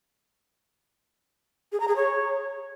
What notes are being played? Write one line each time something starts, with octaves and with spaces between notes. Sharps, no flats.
G#4
A#5
G#4
C#5